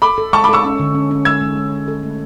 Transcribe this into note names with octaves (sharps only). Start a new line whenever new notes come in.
A4 B5 D6
A4
G#3 A5 C#6
B5 D6
A4 C#6 E6
C#4
D3
C#4
C#4
G#3 E6 G#6
G#3
G#3
G#3
A4
A3